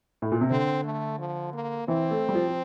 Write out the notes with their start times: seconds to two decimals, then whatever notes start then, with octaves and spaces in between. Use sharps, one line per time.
0.22 A2
0.32 A#2
0.41 C3
0.50 D3 C4
0.85 A3
1.19 F3
1.54 A#3
1.88 E3 C4
2.11 A3
2.29 G3
2.35 F3
2.49 F3